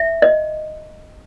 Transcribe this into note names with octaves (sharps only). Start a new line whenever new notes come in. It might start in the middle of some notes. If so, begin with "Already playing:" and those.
Already playing: E5
D#5